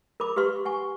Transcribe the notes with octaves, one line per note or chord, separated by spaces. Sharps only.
A#4 B5 D6
G4 B4 F5 C6 C#6
F#5 G#5 C#6